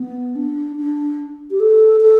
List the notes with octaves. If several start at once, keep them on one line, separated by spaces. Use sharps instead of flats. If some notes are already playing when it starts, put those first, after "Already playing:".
Already playing: B3
D4
D4
G4
A4
A4